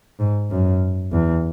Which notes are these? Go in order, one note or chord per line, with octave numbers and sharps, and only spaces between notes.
G#2
F#2
E2